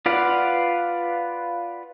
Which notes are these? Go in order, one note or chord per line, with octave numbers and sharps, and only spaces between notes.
F4 B4 D5 F5 F#5